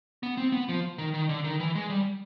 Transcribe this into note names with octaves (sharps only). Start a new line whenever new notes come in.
B3
C4
B3
F3
D#3
D#3
D3
D#3
E3
G#3
G3